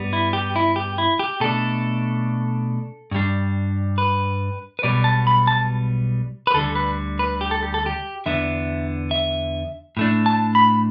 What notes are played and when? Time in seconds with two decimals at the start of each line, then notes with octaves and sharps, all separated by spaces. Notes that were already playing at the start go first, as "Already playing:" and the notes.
Already playing: G2 G3 B3
0.13 E4
0.33 G4
0.56 E4
0.76 G4
0.98 E4
1.19 G4
1.40 B2 A3 D4 A4
3.11 G2 G3 D4
3.98 B4
4.79 B4
4.83 B1 B2 G3 B3 D5
5.04 A5
5.27 B5
5.47 A5
6.47 B4
6.54 D2 D3 G3 A4
6.75 B4
7.19 B4
7.41 G4
7.51 A4
7.63 G4
7.74 A4
7.86 G4
8.26 E2 D3 B3 D4 E5
9.11 E5
9.97 A2 A3 D4
10.26 A5
10.55 B5